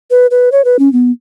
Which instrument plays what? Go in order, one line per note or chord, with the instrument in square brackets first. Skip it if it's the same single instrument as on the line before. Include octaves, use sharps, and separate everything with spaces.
[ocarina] B4
B4
C#5
B4
C#4
B3